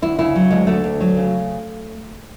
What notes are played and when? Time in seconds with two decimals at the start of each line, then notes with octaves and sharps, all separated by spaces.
0.02 D2 E4
0.19 C#3 E4
0.35 F#3
0.51 D2 G#3
0.67 D2 A3
0.84 D2
1.01 F#3
1.17 C#3